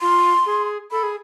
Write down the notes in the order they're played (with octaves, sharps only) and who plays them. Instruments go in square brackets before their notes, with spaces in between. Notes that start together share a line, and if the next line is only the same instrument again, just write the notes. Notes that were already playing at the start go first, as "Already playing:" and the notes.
[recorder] F4 [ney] C6
[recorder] G#4
[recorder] A4 [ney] B5
[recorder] G#4